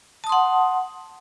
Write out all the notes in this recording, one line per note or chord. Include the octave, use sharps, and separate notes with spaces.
F#5 A5 C6 D#6